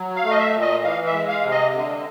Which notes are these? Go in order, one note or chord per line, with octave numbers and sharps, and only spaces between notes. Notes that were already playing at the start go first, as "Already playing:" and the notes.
Already playing: F#3
F5
A3
D#5
E5
A#2
D#5
E3 F5
E5
G#3
F5
C3
D#5
D3